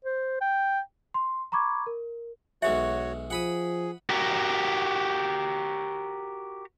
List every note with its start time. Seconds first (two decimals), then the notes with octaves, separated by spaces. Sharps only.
0.05 C5
0.41 G5
1.14 C6
1.52 A#5 B5 C#6 D6 G#6
1.87 A#4
2.62 B1 G#3 F#4 C#5 E5 F#5
3.30 F3 G#4 F#5 B5 D#6
4.09 F#4 G4 A#4